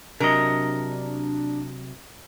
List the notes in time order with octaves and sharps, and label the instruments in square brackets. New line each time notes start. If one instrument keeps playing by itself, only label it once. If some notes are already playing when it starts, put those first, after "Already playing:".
[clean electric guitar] C3 F#3 D#5 [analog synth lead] D4 [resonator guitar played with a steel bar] A#4